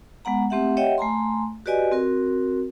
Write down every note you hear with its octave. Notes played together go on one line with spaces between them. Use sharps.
G#3 B3 F#5 A#5
A3 C4 G4 E5 F#5
G4 C#5 D#5 E5 F#5 G5
A3 G#5 A#5 C6
F#4 G4 B4 D5 D#5 G#5
C4 F#4 A#4